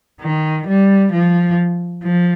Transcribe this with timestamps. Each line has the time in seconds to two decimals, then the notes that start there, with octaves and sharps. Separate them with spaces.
0.21 D#3
0.67 G3
1.12 F3
2.03 F3